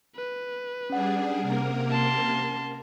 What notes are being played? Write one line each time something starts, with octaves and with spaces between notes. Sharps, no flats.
B4
G3 C#4 D4 G#4 F#5
C3 A#3 A#4
A5 C6